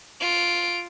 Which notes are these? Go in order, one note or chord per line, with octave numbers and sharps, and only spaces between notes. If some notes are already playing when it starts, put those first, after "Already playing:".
F4 D7